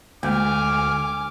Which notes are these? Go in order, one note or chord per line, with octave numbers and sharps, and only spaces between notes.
D2 G#3 A#3 G#5 D6 F6